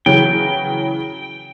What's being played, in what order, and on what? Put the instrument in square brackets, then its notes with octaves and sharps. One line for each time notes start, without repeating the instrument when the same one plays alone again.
[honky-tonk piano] C#3 E3 F#3 [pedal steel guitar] G5